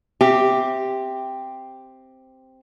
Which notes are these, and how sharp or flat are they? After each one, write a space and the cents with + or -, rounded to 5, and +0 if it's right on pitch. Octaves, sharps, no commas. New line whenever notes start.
C4 +0 G4 +0 E5 +0